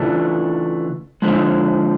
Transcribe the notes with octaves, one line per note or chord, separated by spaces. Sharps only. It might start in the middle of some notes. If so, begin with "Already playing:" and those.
Already playing: C#3 E3 A3 D4 F4
D3 F3 G#3